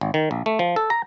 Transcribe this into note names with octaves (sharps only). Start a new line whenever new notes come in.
G#1
D#3
A#1
A3
F3
A4
A#5